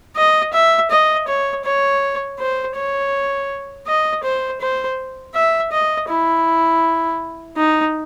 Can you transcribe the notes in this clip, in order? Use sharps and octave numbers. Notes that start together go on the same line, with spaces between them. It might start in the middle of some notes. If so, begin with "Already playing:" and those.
D#5
E5
D#5
C#5
C#5
C5
C#5
D#5
C5
C5
E5
D#5
E4
D#4